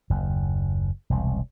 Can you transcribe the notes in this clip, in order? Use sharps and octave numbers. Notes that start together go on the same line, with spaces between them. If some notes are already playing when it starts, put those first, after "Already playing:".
F#1 D#2
E1 C2